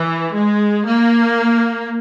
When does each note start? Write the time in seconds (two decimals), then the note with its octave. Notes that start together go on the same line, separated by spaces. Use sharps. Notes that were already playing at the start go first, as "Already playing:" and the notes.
Already playing: E3
0.35 G#3
0.87 A#3